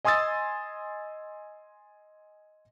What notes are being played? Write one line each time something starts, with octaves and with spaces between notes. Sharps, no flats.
D#5 G#5 C6 D#6 E6 A6